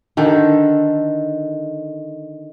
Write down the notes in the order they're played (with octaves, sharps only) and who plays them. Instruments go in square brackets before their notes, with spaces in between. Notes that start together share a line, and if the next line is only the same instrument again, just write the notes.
[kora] D3 D#3 A4